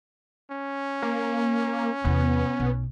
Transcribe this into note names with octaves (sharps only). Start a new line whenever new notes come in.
C#4
A#3
E2 C3 B3
B1